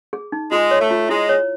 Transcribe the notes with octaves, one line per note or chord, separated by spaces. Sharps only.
G#4
D#4
G#3 F4
C#5
A3
F4
G#3 E4
C#5